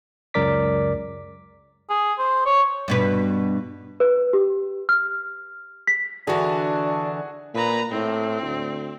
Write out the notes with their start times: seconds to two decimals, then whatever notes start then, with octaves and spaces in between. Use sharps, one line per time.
0.34 C#2 F#2 A#4 D5 D6 B6
1.89 G#4
2.18 C5
2.46 C#5
2.88 G2 B2 B4
4.00 B4
4.33 G4
4.89 F6
5.87 B6
6.27 D3 E3 D4 F#4 G#4
7.54 A#2 B4 A#5
7.91 A2 C4
8.42 D2